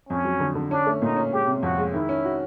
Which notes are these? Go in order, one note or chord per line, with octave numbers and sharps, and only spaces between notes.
F2 C#4
F#3
D3
D3
C#4 D4
A3
A#2 D#4
C#4
G#3 G4
C3
F2 F#4
G#3
D#3 E4
C#4
F#4